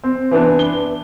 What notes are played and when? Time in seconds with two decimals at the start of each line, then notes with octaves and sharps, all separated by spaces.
0.04 C4
0.31 E3 B3 D4
0.59 G7